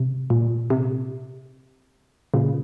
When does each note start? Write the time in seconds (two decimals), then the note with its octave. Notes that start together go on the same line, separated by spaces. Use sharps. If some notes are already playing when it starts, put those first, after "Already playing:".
Already playing: C3
0.30 A#2
0.70 C3
2.34 A#2 C#3